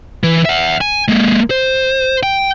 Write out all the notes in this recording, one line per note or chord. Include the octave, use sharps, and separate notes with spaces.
E3
E5 F#5
G#5
G#3 A#3
C5
G5